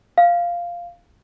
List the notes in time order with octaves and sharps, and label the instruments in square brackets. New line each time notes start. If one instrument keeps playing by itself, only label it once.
[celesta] F5